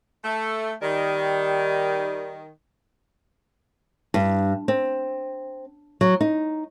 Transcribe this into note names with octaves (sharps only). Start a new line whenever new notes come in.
A3
D#3 G3
G2
C4
F#3
D#4